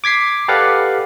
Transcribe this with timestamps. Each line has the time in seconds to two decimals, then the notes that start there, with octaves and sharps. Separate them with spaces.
0.04 D6 G#6 B6 C7
0.48 G4 A4 B4 D5 F5 F#5